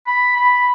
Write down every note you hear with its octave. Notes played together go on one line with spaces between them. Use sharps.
B5
B5